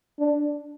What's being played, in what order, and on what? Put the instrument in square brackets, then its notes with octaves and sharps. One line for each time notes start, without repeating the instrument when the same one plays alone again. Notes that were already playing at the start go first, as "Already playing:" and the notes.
[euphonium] D4